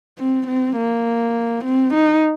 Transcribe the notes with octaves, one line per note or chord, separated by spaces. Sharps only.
C4
C4
A#3
C4
D#4